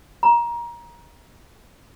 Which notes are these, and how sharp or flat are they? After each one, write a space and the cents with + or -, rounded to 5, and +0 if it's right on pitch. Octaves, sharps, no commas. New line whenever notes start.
A#5 +25